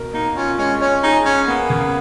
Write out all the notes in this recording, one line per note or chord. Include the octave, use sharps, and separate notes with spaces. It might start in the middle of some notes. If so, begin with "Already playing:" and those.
Already playing: B2 A#4
A#3 D#4
C#4 F4
G#3 C#4
C#4 C#5
D#4 G#4
C#4 G#4
A#3 B3
C#3